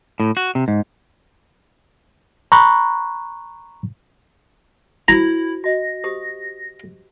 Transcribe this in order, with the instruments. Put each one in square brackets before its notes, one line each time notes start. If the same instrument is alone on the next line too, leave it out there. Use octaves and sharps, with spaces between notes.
[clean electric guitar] A2
F#4
C3
G#2
[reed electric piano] A#5 B5 C#6 F#6
[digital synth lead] E4 [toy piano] F#4 C5 [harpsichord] A#5
[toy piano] F#4 D#5 [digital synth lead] A#6
[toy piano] G4 C5 D#6